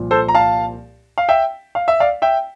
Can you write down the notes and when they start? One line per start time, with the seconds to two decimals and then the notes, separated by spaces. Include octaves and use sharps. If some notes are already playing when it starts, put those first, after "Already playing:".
Already playing: C2 A#2 F3
0.11 A4 C5
0.28 A#5
0.35 F5 A5
1.18 F5
1.29 E5 G5
1.75 F5
1.88 E5
2.00 D5 F5
2.22 E5 G5